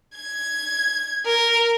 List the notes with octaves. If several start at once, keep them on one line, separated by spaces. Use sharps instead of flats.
G#6
A#4